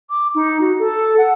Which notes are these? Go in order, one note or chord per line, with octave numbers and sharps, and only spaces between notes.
D6
D#4
F#4
A4
F#5